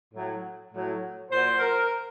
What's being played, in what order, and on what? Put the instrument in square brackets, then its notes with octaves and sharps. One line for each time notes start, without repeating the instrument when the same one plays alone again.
[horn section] A2 F#3
A2 F#3
A#2 F#3 C5
A#4